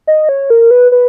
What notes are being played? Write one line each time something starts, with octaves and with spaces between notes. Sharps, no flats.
D#5
C#5
A#4
B4
B4